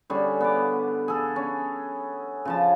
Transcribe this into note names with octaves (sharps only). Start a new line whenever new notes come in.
D3 G3 C#4 G#4
B3 D6
G#4 A4
C#4
C#3 F3 A5